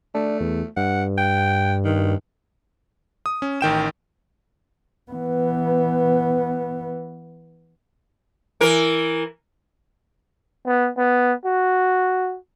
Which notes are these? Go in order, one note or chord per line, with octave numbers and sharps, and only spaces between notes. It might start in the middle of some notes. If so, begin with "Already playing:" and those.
A3 D4
E2
G2 F#5
G5
D#3
D#6
C#4
A1 D#3 G5 E7
E3 B3
E3 A#4
B3
B3
F#4